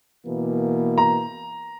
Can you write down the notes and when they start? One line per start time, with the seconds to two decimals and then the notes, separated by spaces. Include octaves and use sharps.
0.25 B2 E3 A#3
0.98 A#5